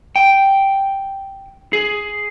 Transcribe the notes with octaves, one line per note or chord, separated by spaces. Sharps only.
G5
G#4